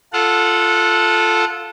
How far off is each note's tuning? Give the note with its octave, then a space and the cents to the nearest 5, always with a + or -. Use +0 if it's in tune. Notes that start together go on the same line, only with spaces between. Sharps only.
F4 -10 A4 +0 F#5 -25